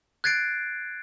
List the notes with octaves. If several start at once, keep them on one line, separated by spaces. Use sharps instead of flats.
F#6 G#6 A6 C7 D7